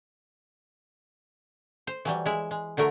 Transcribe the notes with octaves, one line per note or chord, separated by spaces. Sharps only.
C5
E3 F#3 G3
G#3 E4
G#3
D3 F#3 A3 A#4